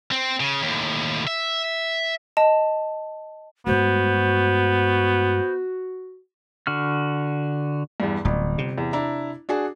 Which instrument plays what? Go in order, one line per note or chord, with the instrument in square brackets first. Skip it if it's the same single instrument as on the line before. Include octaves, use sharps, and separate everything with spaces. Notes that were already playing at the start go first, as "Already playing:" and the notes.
[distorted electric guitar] C4
C#3
D#2 A2
E5
[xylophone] D#5 A5
[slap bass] G2 G#3 A3 [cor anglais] B3 [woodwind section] F#4 [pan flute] C5
[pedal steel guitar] D3 F#4 F6
[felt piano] E2 G2
[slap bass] D1 [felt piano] G1
[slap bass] C3
[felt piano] E2
D4 E4 A#5
D4 F#4 G#4